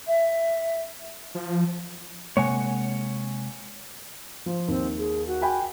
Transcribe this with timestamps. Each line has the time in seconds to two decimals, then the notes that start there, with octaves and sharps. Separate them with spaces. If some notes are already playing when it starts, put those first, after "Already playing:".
0.07 E5
1.35 F3
2.37 C3 G#3 A#3 C#5 F#5 G#5
4.46 F3
4.68 D#2 C4
4.98 G#4
5.27 F#4
5.42 G5 G#5 B5